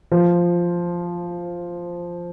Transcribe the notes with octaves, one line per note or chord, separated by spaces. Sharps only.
F3